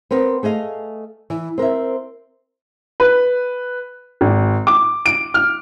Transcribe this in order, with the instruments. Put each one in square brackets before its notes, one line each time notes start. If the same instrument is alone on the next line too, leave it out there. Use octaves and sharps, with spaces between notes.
[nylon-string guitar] B3 C4 A#4
A3 G#4 D#5 F5
E3
C4 A#4 C5 E5
[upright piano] B4
G#1
D6
D7
F6